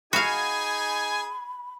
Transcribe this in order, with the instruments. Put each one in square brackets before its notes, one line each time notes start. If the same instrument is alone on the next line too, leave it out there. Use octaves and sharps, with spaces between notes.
[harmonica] D#4 G#4 [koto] F#4 F5 [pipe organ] G#5 [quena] B5